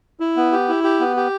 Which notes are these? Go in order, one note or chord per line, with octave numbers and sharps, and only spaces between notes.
E4
B3
G4
E4
G4
B3
G4